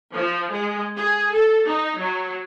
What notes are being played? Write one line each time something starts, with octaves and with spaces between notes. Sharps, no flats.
F3
G#3
G#4
A4
D#4
F#3